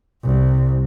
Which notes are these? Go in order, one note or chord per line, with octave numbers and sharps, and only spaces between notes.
C2